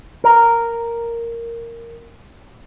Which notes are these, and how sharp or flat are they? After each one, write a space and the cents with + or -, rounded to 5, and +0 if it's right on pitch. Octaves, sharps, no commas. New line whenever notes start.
A#4 -5